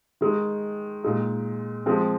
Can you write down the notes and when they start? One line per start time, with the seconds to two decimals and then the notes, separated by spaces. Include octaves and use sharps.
0.21 D#3 G#3 D#4
1.04 A#2 G#3 D#4
1.86 F3 G#3 C4